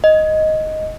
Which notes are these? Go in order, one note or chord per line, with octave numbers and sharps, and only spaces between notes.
D#5